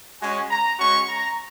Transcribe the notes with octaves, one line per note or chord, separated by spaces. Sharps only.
G#3 C#4 F#4 G#5
A#5
G#3 C#4 F#4 C#6
A#5